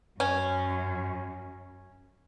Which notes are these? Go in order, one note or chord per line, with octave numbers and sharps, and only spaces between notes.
F#2 C#4